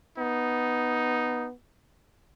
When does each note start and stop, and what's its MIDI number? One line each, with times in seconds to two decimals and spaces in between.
0.18 1.51 59
0.18 1.48 63